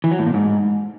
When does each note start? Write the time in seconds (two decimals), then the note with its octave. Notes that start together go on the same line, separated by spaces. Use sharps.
0.04 E3
0.11 F#3
0.19 A2
0.27 A#2
0.34 G#2